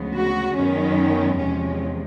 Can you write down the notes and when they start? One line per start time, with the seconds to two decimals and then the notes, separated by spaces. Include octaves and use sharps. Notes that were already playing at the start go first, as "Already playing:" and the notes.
Already playing: D2 C#3 F3 G#3 B3
0.16 F#4
0.56 F#2 D#3 F#3 B3 C#4
1.38 E2 C3 F3 G#3 C#4